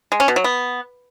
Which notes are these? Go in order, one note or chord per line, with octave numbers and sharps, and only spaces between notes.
G#3
C#4
B2
F#3
B3